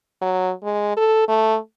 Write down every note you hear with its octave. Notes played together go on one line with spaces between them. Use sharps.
F#3
G#3
A4
A3